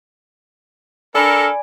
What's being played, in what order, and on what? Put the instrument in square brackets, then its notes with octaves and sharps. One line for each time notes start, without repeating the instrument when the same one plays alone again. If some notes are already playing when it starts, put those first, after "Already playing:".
[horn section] D4 A4 A#4 [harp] D5 G#5 B5